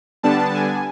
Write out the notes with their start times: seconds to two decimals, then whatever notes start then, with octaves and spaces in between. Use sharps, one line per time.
0.23 D3 G3 B3 D4 A5
0.54 G#5